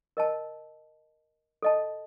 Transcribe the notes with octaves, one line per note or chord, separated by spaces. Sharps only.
A#4 D#5 A5
A4 D#5 A5